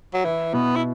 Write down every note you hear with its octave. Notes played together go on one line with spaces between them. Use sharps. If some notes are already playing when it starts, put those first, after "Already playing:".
F#3
E3 E4
B2 B3
E4